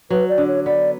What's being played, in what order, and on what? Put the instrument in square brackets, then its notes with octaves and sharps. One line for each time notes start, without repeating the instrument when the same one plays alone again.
[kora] F#3 [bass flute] B4
[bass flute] D5
[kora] D3
[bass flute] C#5
[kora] B3 [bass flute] D5